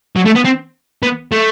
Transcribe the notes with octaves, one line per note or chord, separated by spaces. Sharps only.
F#3
A3
B3
C4
B3
A3